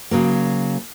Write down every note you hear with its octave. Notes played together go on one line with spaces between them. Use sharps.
C#3 F#3 A#3